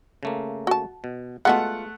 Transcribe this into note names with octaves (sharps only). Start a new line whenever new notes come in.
C#3 A3 A#3
F#4 A5
B2
G#3 A3 B3 F4 F#4 F#5